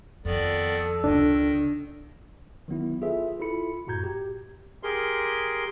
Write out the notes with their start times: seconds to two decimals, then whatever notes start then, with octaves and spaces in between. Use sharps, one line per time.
0.25 F2 D#3 B3 A4 D5
1.04 C#2 D#3 D4
2.68 D#3 F#3 B3 E4
3.02 F4 G#4 A4 B4 E5
3.40 E4 F4 A4 B5 C#7
3.87 F#2 A2 F#4 A#5 G6 G#6
4.03 G4
4.83 G4 G#4 A#4 C6